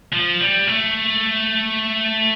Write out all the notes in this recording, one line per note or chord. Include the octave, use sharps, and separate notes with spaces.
F3
G3
A3